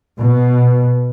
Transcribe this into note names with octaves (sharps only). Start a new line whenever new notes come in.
B2